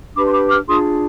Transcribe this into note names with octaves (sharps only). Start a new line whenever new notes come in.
D4 G4 B4 B5 D6
C6
B5 D6
D6 F6
D4 F4 G#4 C6 D#6